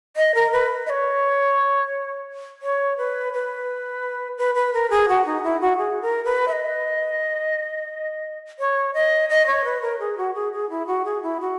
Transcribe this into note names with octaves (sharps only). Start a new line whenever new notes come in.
D#5
A#4
B4
D#5
C#5
C#5
B4
B4
B4
B4
A#4
G#4
F#4
D#4
E4
F#4
G#4
A#4
B4
E5
D#5
C#5
D#5
D#5
C#5
B4
A#4
G#4
F#4
G#4
G#4
E4
F#4
G#4
E4
F#4